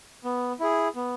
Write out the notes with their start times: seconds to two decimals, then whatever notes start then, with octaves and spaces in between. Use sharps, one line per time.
0.24 B3
0.60 E4 G#4
0.95 B3